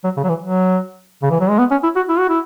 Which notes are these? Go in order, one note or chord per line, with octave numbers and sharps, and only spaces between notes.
F#3
C#3
F#3
E3
F#3
C#3
E3
F#3
G#3
B3
C#4
E4
F#4
E4
F#4
E4